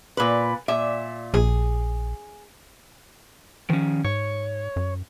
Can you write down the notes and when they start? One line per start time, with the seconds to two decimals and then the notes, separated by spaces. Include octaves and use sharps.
0.17 A#2 B4
0.68 A#2 E5
1.34 A#1 G#4
3.70 D#3 F3 C#4
4.05 G#2 C#5
4.76 F#2